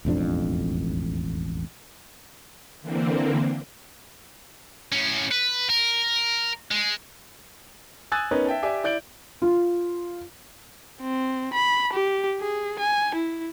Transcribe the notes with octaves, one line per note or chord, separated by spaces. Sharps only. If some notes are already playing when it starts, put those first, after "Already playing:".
E1 A1 F2 D4
D3 E3 A#3 C4
A2 C#4
B4
A#4
G#3
G#5 D#6 E6 F#6 G#6 A6
B3 C#4 D#4 A#4 B4 C#5
E5 G5 A5
G4 D5 E5 G#5
E4 D5 G6 D7 F#7
F4
C4
B5
G4
G#4
G#5
E4